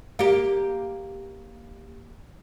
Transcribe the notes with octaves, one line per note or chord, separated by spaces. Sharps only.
A#3 G4